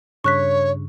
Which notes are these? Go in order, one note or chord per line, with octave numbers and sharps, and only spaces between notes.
G2 C#3 C#5 C#6 F#6 B6